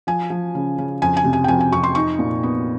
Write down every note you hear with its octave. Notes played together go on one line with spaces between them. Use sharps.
F3 G#5
F3
C#3
C#3
F2 G#5
G#5
C3
G#5
G5
F2 G#5
G#5
F2 C#6
C6
D#4 C#6
A#2
B3